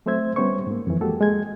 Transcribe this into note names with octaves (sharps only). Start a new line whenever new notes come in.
F#3 A3 C4 C5 E5 G#6
G3 B3 C#4 C5 C#6
G#2 A#3
F2 E3
G#3 A#3 F#4 G4 A4
G#3 G#6